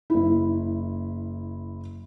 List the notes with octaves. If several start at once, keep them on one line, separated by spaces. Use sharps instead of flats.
F#1 E4